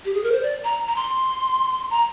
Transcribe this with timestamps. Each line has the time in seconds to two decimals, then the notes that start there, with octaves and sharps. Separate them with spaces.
0.05 G4
0.14 G#4
0.23 A#4
0.32 C5
0.43 D5
0.64 A#5
0.87 A#5
0.96 C6
1.90 A#5